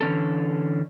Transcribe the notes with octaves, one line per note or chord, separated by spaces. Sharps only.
D3 E3 C#4 A4